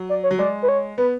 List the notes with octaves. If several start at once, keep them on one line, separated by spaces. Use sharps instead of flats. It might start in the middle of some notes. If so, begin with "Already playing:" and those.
Already playing: F#3
D5
C#5
F#3
G#3 D5
B4
C#5
B3 B4